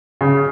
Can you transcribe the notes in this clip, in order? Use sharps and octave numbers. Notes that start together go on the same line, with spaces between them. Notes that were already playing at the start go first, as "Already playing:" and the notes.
C#3